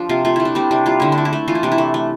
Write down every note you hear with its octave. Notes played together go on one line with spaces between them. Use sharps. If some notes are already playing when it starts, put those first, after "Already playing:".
Already playing: F3 D4 G4
C3 F4
A3 F4
A3 E4
D4
G3 C4
C3 D4
G3 F4
D3 E4
D4
A3
E4
A3
E3 F4
E4
C3 D4
E4
A3
A3